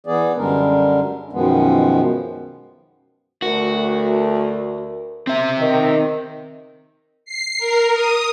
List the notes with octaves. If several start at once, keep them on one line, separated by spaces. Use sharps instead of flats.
E3 B3 G#4 D5
F#2 D3 G3 G#3 D4 A#4
F#2 B2 D#3 F3 G#3 B3
D2 A3 F#4 A#4
C4 E5
D#3
C7
A#4
D#6